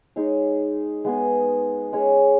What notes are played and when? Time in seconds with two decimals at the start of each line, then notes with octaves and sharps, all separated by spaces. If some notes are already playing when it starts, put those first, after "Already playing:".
0.16 G#3 D#4 G#4 C#5
1.05 G#3 B3 G#4
1.93 G#3 C#4 G#4 C#5